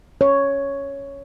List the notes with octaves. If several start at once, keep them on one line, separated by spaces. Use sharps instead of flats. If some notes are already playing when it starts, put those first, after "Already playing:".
C#5